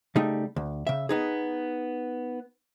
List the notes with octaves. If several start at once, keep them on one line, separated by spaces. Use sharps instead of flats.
C#3 G3 A3 D#4
D2
C#3 E5
B3 D#4 G#4